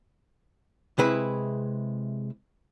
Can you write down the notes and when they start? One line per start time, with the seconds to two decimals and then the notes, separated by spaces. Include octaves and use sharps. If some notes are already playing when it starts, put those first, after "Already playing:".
0.99 C3 G#3 E4 G#4 B4